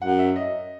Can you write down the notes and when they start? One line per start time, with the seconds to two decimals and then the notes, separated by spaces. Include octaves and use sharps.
0.01 F#2 F#5
0.19 E5
0.36 D#5